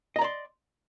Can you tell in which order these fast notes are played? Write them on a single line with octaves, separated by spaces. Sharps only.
D#5 A#5 D5 C6